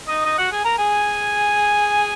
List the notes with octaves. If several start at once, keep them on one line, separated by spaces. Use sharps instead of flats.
D#4 D#5
D#4 D#5
F#4 F#5
G#4 G#5
A#4 A#5
G#4 G#5